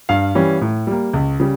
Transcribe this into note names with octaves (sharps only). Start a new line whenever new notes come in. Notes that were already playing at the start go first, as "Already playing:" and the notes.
G2 F5
E3 G3 C#4
A2
G3 A#3
C#2
C#3 G3